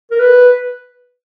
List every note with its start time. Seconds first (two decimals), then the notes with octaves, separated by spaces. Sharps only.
0.11 A#4
0.19 B4